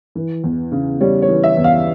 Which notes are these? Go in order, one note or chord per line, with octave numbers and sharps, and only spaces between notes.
E3
E2
C#3
G3 C#5
C#5
E3
E5
E2
F5